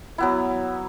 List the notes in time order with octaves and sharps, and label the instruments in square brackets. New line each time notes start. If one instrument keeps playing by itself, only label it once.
[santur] F#3 B3 E4